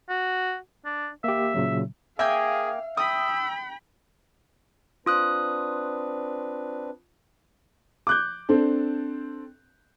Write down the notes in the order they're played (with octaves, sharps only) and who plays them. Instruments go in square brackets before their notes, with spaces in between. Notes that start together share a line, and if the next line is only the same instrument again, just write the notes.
[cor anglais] F#4
D4
[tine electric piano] A#3 G4 [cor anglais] E5
[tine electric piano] A#2 C#3 F#3
[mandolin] A#3 G5 G#5 [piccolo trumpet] G#4 [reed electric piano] E5 [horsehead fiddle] F5
[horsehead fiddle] G5 B5 [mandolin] D#6 [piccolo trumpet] E6
[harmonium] C4 D4 B4 [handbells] F4 D#6 F#6
[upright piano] D6 F#6 G6
C4 D4 A4